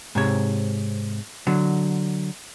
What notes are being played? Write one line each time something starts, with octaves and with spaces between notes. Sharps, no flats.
G#2 C3 C#5
D3 F#3